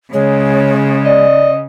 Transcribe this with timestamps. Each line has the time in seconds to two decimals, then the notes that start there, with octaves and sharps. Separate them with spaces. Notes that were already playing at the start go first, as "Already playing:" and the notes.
0.13 C#3 G#3 C#5
1.04 D5 D#5